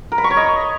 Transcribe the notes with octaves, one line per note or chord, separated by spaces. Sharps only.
A#4
B5
C#6
C#5
D#5